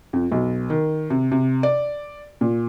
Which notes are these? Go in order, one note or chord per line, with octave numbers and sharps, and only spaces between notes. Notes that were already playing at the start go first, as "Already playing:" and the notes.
F2
B1
D#3
C3
C3
D5
A#2